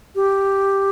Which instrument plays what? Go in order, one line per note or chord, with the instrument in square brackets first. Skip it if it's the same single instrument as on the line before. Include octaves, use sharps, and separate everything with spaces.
[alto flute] G4